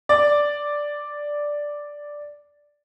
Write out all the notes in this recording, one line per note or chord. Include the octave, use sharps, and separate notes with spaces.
D5